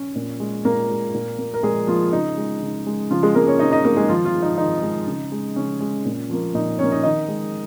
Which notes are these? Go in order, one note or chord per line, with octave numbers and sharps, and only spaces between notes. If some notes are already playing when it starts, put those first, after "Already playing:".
Already playing: C#4
A#2
G#3
A#2 A#3 A#4
G#3
A#2
A#3
A#4
A#2 G#3 G#4
F3 A#3 F4
C#3 D#4
G#3
C#3
G#3
C#3 F3 F4
G#3 G#4
G#3 A#3 A#4
C#4 C#5
C#3 D#4 D#5
D#4 D#5
G#3 A#3 A#4
G#3 G#4
D#3 F3 F4
F3 F4
G#3
D#4
D#3 D#4
G#3
C#3
G#3
C#3 C#4
G#3
A#2
F3 A#3
A#2 D#4
F3 A#3 C#4 C#5
D#4 D#5
D#3 D#4 D#5
G#3